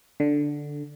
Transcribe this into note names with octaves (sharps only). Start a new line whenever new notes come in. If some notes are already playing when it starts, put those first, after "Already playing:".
D3